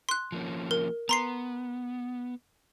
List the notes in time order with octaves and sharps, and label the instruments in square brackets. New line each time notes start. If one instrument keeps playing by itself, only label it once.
[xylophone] C6 F#6
[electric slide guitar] F3 A#3 C#4
[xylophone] A#4
[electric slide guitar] B3 [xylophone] A#5 C6 C7